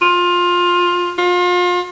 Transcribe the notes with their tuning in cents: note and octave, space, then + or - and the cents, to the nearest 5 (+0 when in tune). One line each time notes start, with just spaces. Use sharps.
F4 +20
F4 +35